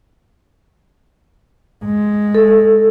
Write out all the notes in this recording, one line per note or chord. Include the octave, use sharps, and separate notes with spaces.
G#3
A4